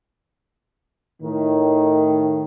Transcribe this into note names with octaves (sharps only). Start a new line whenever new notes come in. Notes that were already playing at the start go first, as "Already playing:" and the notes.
A2 D#3